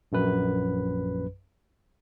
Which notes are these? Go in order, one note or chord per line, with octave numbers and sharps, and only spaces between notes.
A#1 F#2 B4